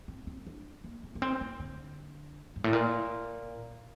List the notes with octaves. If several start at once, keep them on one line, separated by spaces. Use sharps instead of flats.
C4
C4
D4
A#3
C4
A#3
C4
A#3
D3
G2
A2
A#2